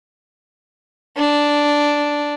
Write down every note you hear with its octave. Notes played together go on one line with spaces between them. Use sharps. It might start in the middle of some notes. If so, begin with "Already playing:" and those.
D4